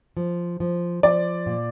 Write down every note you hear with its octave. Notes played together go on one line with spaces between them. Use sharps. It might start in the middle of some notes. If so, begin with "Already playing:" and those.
F3
F3
F3 D5
A#2